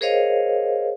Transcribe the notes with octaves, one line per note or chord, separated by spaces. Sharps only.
G#4 A#4 C5 C#5 D#5 F5